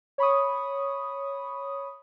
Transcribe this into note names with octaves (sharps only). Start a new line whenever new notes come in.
C#5 B5 C#6 D#6